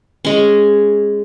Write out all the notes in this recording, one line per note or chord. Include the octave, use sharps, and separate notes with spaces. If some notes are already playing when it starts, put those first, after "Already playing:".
G#3 C#4